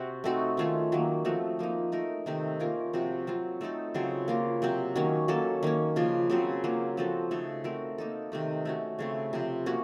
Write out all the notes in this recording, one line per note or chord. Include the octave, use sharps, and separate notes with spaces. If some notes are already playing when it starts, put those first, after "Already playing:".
Already playing: C3 C4 F#4
A3 C4 D#4 F#4
D#3 A3 C#4 F4
D#3 F#3 A#3
F3 A3 C4 F#4
F3 A#3 D#4
A3 D#4 A#4
C3 D#3 A3 D#4
A#3 C#4 F4 A#4
C3 F3 C4 F#4
F#3 C4 F4
A3 C4 D#4 A4
C#3 F#3 C4 F4
A#3 F4 A#4
C3 F#3 C4
D#3 F#3 A#3 C#4
F#3 A#3 C#4 A4
D#3 A#3 C#4
C#3 F3 A#3 F4
C#3 F#3 C4
F#3 A#3 F4
F3 C4 F#4 A4
C#3 A3 D#4 A4
A3 C4 F#4 A#4
A#3 D#4 A4
C3 D#3 A3 D#4
A3 C#4 F#4
C#3 A3 C4
C3 F3 C4
A#3 C#4 F#4